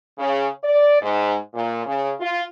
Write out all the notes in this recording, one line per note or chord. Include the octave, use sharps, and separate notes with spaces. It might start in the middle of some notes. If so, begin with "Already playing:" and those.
C#3
D5
G#2
A#2
C#3
F4